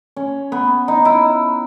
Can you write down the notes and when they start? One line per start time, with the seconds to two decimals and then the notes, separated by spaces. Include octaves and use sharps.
0.16 C#4
0.52 B3
0.88 D#4
1.05 E4